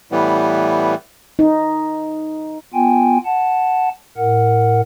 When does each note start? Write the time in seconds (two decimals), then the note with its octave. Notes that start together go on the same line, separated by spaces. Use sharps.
0.12 A2 E3 G3 B3
1.39 D#4
2.74 B3 F4 G5 G#5
3.26 F#5 A5
4.17 A2 A#4 F#5